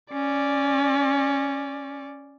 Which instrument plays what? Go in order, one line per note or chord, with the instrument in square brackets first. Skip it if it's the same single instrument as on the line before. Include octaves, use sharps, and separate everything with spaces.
[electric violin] C#4 D5